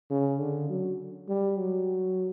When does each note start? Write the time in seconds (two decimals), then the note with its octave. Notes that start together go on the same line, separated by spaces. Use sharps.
0.10 C#3
0.40 D3
0.69 F#3
1.28 G3
1.57 F#3